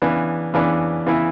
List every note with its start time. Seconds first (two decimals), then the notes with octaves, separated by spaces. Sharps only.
0.02 C#3 E3 B3 D4
0.54 C#3 E3 B3 D4
1.06 C#3 E3 B3 E4